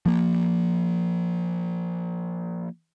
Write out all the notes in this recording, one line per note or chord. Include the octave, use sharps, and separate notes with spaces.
F3 A#3